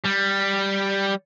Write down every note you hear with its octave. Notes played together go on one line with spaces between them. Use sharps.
G3